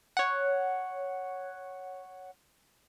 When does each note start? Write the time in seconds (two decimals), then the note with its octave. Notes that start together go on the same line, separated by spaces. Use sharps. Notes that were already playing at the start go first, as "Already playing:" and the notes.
0.17 C#5 F#5